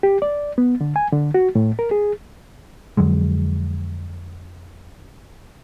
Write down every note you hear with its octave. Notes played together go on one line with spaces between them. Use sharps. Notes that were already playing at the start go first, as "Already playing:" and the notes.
G4
D5
B3
D3
G#5
D3
F#4
A2
A#4
G#4
F2 D3 F#3 G#3